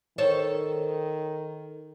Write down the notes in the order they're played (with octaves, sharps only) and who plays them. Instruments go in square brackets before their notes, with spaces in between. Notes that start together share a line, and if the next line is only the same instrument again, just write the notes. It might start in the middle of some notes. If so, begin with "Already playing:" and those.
[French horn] D#3 [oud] A4 C5 C#5